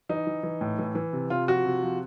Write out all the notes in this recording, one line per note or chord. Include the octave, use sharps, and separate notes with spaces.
E3 D#4
E3
E3
A2
E3
E3
C3
C3 F4
F3 F#4
C3
F3